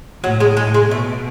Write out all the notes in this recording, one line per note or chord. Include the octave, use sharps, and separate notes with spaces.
A2 F#3
G#3
G#3
G#3
B2 A3